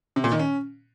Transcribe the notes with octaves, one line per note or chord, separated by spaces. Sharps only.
C3
A#2
D#3
C#4